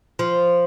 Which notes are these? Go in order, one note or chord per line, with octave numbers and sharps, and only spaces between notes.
F3